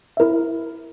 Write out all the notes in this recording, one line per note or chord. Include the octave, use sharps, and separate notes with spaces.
E4 A#4 E5